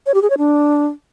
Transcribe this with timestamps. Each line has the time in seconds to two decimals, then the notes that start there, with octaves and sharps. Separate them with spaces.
0.06 C#5
0.14 G4
0.22 G#4
0.30 C#5
0.38 D4